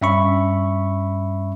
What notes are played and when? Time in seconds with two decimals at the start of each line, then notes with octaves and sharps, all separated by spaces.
0.01 G2 C#4 E5 B5 C#6